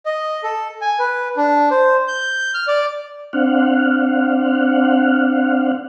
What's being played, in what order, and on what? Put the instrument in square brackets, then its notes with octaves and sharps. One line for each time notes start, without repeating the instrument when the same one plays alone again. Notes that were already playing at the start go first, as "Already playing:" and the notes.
[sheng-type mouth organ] D#5
A4
G#5
B4
D4
C5
G6
F6
D5
[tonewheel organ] C4 D4 F5 F#5